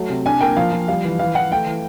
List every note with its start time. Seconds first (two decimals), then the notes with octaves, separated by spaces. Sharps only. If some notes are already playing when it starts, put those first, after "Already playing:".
Already playing: F#3 A3
0.10 C3
0.26 D4 G#5
0.41 A#3 G5
0.57 F3 F5
0.72 F3
0.88 G3 F5
1.04 E3
1.19 E3 F5
1.35 E3 F#5
1.51 A3 G5
1.66 E3